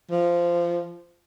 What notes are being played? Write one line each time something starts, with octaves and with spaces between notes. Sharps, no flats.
F3